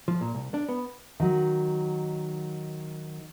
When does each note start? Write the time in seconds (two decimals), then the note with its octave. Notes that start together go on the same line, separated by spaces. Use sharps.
0.08 F3
0.21 A#2
0.35 C2
0.54 D4
0.69 B3
1.20 D#3 F#3